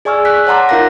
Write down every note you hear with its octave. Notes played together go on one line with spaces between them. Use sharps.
G#4 D5 G#5 C#6 E6 F6
F#6 B6
C#5 F#5 A5 A#5 C6 D6
D#4 F4 A#4 F5 F#6 A#6